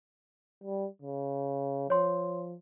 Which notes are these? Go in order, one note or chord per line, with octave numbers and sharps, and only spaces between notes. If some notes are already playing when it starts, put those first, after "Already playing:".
G3
C#3
F3 C#5 C6